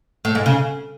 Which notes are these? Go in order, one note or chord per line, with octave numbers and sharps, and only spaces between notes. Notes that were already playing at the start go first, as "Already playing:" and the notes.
A2
G#2
C#3